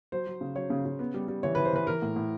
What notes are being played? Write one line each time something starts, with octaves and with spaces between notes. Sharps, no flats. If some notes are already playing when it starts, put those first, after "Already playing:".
F#3 C5
F#3
C#3
F#3 C#5
C#3
C#3
B3
G3
G3
E3 C#5
B4
E3
C5
E3 B4
E3 A#4
A2
A2